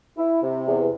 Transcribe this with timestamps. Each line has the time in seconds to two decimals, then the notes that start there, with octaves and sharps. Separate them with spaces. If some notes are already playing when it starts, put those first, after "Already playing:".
0.18 E4
0.42 C3
0.67 E2